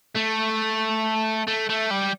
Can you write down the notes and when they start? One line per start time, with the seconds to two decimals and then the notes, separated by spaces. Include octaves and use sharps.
0.16 A3
1.47 A3
1.69 A3
1.90 G3